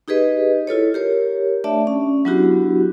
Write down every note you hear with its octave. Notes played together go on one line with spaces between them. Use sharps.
D#4 G4 G#4 B4 D#5
E4 F4 A4 C#5
G4 A#4 C#5
A3 D4 D5 E5 A5
C#4
F#3 B3 D4 E4 F#4 G4